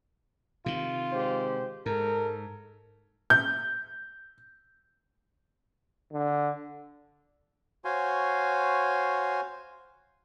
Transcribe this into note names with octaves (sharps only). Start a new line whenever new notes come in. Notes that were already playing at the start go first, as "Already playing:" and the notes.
C3 D#3 F4
G#2 G4 C5
G#2 G#3 A4 A#4
G6
D3
F#4 C5 C#5 F5 G#5 C6